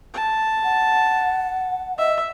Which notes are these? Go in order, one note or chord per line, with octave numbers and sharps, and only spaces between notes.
A5
F#5
D#5 E5